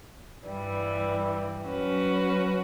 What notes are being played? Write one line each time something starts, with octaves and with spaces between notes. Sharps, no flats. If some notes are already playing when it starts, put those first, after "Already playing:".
G2 E3 G3
F#3 C#4 F#4 B4